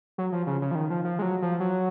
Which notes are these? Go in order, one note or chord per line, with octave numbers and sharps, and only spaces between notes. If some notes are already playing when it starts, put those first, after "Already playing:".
F#3
F3
C#3
C#3
F3
D#3
F3
F3
G#3
F#3
F3
F#3